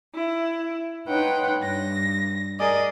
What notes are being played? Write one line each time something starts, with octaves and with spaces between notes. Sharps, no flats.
E4
D#4 B4 C#5 F#5 G5 C6
G2 A#6
G#4 A#4 D5 D#5 G#5